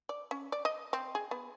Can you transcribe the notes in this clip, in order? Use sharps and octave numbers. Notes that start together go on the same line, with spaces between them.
D5
C#4
D5
D#5
C4
G#4
B3